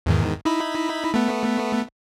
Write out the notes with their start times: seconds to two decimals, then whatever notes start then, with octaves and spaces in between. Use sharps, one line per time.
0.06 E2 G#2 D#3
0.45 D#4 E4 B5
1.14 A3 B3